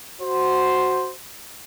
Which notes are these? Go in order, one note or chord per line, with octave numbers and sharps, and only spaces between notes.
F#4 C5